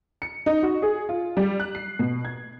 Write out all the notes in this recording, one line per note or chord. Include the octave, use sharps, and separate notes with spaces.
C#7
D#4
F#4
G#4
F4
G3
F#6
C7
B2
G#6